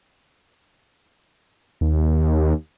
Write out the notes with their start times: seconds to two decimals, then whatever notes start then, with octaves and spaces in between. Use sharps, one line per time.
1.81 D#2